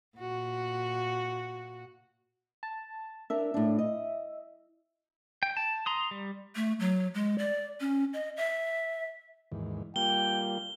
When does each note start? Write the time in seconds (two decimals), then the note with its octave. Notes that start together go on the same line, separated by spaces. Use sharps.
0.18 A#2 F#4
2.63 A5
3.30 D4 A#4 E5
3.54 A2 D4
3.79 D#5
5.43 G5
5.57 A5
5.86 A#5 C6 D#6
6.11 G3
6.55 A3
6.80 F#3
7.14 G#3
7.38 D5
7.80 C#4
8.13 D#5
8.37 E5
9.52 D#2 G#2 E3
9.96 G3 A#3 F4 G5 G7